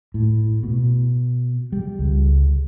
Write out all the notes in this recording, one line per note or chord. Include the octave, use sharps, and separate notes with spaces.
A2
B2
G3
C#2